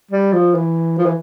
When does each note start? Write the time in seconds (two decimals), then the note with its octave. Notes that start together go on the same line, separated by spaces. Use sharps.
0.11 G3
0.33 F3
0.55 E3
0.98 F3
1.06 E3